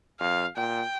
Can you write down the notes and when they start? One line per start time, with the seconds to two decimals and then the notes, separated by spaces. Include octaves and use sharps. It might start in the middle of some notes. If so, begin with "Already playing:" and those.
0.20 F2 F5
0.56 A#2 G5